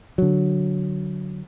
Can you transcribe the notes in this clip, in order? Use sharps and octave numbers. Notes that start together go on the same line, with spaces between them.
D3 F#3